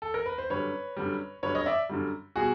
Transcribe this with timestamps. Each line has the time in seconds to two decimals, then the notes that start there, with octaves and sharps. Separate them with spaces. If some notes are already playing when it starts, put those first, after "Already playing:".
0.02 A4
0.14 A#4
0.26 B4
0.38 C5
0.50 F#2 D3 G3 B4 C#5
0.97 F#2 D3 G3
1.43 F#2 D3 G3 B4 C#5
1.55 C#5 D#5
1.66 D5 E5
1.89 F#2 D3 G3
2.36 B2 G3 F#4 G#4